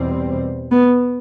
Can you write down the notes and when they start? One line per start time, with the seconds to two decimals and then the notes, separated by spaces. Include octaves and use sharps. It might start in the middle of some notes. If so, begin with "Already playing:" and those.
Already playing: E2 B2 G3 C4
0.72 B3